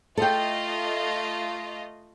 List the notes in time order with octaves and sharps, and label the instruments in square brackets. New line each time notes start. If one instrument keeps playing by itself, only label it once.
[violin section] A3 F4 D#5 [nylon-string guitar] A4 G5